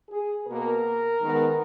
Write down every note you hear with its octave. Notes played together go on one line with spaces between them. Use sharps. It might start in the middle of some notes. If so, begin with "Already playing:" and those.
G#4
B2 A#3 A#4
D#3 G#3 B3